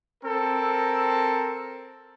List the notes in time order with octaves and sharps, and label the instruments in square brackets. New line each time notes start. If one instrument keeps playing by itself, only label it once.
[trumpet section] C4 A4 A#4